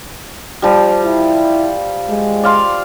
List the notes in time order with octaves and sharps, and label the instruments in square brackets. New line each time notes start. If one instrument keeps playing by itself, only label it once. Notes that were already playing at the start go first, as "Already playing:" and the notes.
[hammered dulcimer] F3 G3
[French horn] E4
G#3
[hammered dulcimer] D5 F5 C6